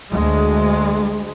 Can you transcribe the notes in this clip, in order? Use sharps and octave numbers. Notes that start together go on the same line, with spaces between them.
D2 G#3